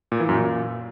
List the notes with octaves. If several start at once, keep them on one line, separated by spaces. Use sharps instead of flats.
A#2
E3
F#2
A#2